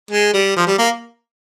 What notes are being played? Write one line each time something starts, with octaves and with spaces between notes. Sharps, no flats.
G#3
G3
F3
G3
A#3